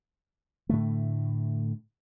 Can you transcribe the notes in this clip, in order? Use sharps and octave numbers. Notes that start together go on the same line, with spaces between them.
A2 D3 A3